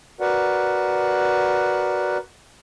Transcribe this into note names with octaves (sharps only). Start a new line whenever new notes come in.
F#4 A#4 B4 D5 F#5